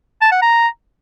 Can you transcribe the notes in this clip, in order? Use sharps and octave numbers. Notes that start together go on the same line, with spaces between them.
A5
F#5
A#5